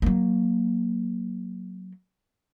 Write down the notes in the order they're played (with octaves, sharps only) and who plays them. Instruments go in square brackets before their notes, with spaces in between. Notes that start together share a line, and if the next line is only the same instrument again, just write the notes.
[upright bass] F#3 A#3